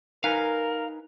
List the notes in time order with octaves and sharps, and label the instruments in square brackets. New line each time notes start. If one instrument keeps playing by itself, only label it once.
[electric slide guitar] D#4 B4 G#5 [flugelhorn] A#4 [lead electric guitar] F5